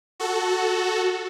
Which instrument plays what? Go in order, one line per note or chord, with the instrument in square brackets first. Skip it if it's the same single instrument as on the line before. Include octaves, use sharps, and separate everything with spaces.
[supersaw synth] F#4 A4